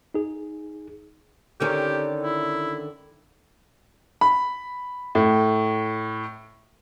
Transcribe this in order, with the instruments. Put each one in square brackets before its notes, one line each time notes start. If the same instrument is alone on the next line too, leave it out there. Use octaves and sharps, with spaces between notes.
[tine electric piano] D#4 G#4
[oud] D3 D#3 C#4 [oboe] G4
[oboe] E4
[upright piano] B5
A2